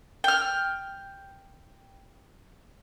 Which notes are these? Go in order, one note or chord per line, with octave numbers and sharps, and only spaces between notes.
G5 F6